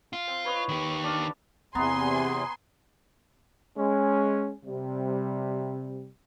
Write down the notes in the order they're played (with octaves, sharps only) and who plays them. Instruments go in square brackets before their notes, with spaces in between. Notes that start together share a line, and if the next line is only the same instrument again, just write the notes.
[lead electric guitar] F4
[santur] C4
B4 C#5 D#5
[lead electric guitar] D#3 G4
[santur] D4 F5
[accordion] E2 C3 [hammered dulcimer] B3 A#5 [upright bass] C4 [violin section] G#5 C6
[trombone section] G#3 C#4
C3 G3